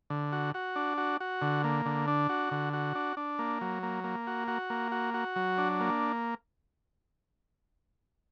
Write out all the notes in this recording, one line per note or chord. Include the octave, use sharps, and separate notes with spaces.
D3
F#4
F#4
D4
F#4
F#4
D3
A#3
D3
D4
F#4
D3
F#4
D4
D4
A#3
F#3
A#3
A#3
F#4
F#4
A#3
F#4
F#4
F#3
D4
A#3